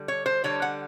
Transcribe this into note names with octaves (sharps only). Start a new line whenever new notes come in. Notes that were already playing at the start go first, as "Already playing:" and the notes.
Already playing: D3 G3
C#5
C5
D3 G3 C#5
F#5